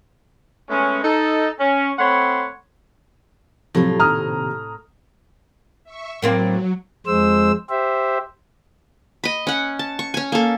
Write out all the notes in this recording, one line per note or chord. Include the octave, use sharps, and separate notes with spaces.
G#3 A3 B3 C#4
D#4 A4
C#4
A3 C4 C#5 F#5 B5 C6
A2 C3 F3 F#3 C4 F4
A#2 D#3 A#5 D#6 F6
E5 C#6
A2 F#3 A#3 C4
F2 G#3 C5 E6
G4 C5 E5
D#5 B5
C#4 F#5
A5
C#6
C#4 G#5
A#3 A4